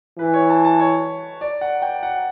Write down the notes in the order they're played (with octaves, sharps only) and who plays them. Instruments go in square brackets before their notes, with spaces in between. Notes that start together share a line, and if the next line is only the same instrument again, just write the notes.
[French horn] E3 [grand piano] B4
[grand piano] C#5
A5
A5
C#5
D5
F#5
G5
F#5